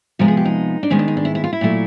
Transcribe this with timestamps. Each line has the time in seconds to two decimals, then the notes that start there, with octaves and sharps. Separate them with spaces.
0.19 C3 F3 G#3 B3 A#4
0.28 G#4
0.37 G4
0.45 D#4
0.83 D4
0.90 G#2 D#3 G#3 B3 C#4
0.99 D4
1.08 D#4
1.17 D4
1.25 E4
1.35 E4
1.44 F4
1.53 E4
1.61 A#2 F#3 A3